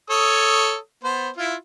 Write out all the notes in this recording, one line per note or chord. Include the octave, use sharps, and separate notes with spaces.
A4 C#5 D#6
B3 C5
E4 F4